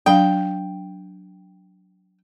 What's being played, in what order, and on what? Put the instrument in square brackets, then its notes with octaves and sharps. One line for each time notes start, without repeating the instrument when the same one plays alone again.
[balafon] F#3 D4 F5 [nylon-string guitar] G5